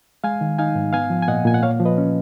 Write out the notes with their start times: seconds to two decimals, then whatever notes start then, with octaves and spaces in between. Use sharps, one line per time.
0.24 G#3 F5 G#5
0.41 D#3
0.59 D#4 F5 G#5
0.75 G#2
0.93 B3 F5 G#5
1.10 F3
1.22 G#5
1.28 A#2 D#5 F#5
1.45 A#2 G#5
1.54 F#5
1.62 A#3 C#5 F5
1.80 F3
1.85 B4 D#5
1.98 C#4